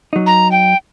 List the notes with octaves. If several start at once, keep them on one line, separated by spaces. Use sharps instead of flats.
F#3 D#4
A#5
G5